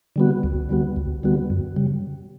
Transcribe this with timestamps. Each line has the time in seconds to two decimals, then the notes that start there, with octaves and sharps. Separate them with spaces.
0.16 D3 G3 B3 F#4
0.43 D2
0.69 D3 G3 B3 F#4
0.96 D2
1.23 D3 G3 B3 F#4
1.50 F#2
1.76 C#3 G3